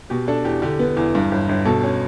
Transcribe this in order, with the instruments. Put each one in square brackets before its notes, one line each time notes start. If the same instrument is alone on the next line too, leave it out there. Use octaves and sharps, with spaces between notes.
[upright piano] B2 G4
D4 A4
E2 G4
D3 G4
B3
E2
G2
G1
G1
B2 A4
C#4